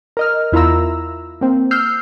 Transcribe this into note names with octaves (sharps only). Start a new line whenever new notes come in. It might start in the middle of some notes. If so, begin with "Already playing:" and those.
A#4 D#5 F6
E2 E4 F4 A#4 A#5 E6
A#3 C4
E6 F6 G6 C7